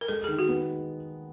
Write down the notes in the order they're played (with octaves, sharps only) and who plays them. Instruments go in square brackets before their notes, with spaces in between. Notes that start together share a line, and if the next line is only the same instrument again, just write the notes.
[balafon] A#4
[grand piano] G#3 [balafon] A4
[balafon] G#4
[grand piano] D#3
[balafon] F#4
[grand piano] B3